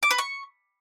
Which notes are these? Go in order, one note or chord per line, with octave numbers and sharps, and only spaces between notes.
D6
B4
C#6